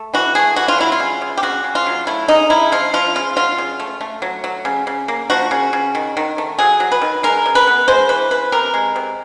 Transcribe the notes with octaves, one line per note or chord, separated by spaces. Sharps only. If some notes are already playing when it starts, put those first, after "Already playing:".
Already playing: A3
E3 F#4
A3 G#4
E3 F#4
F4
F#3 E4
F4
C#3
C#3
G4
C#3 F#4
C#3
F4
F#3
A3 E4
C#3 D#4
C#3 E4
F3 F4
F3 F4
C#3 F4
F#3 F4
C#3
A3
A3
F#3
F#3
C#3
C#3
A#3
F3 F#4
C#3
C#3
D#3
D#3
A3
F#3 G#4
F#3
B4
D#3
G#3 A#4
C#3
B4
B3
G#3 C5
E3 B4
C#3 B4
C3 A#4
G#3
C3